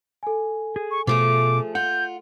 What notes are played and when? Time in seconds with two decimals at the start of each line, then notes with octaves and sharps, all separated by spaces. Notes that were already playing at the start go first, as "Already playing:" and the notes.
0.23 A4 G#5
0.76 G#4
0.91 C#6
1.07 B2 F3 A3 F4 G#4 D6
1.75 F4 F#5 G6